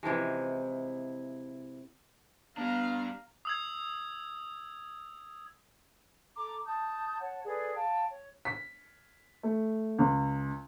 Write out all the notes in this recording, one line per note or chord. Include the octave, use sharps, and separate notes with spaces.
C3 E3 F3 G#3
G3 B3 D4 F5 A#5
D#6 E6 G#6
A4 A#5 D6
A5 D#6 G6
C#5 F#5 A5
G#4 A4 B4 D5
F5 G5 A5
C#5
B6
A3
C#2